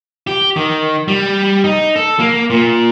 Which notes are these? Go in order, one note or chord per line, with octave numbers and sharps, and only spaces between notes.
G4
D#3
G3
D#4
A4
A#3
A#2